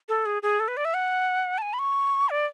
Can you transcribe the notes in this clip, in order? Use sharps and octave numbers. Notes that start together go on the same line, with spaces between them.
A4
G#4
G#4
A4
B4
D5
E5
F#5
A5
G#5
B5
C#6
D5